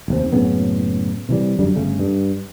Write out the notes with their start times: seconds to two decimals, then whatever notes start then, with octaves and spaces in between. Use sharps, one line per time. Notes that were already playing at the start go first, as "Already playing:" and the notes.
0.08 F1 D#2 C4
0.33 F#1 A2 C#3 B3
1.29 C3 E3 G3
1.59 F#2 D3 G3
1.75 G1 C#3 A3
1.99 G2